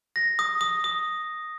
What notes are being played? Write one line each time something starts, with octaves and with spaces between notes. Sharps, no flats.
A#6
D#6
D#6
D#6